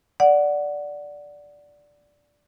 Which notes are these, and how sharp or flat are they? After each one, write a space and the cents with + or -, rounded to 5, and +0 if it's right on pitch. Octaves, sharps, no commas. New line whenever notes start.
D5 -5 F#5 +0